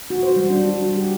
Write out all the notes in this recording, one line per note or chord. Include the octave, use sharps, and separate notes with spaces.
F#4
C5
G3
D4
F#4
G3
G4